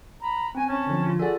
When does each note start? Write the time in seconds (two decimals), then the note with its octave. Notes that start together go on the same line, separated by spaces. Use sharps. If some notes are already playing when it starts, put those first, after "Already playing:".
0.22 A#5 B5
0.55 C4 G#5
0.67 C#4 A5
0.87 D3 F3
1.06 F4
1.19 F#4 G#4 A4 D5